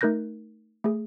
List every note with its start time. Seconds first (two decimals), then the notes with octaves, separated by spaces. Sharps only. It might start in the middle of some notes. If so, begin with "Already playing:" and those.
0.01 A3 D#4 A#4 F#6 G6 A#6
0.84 A3 G#4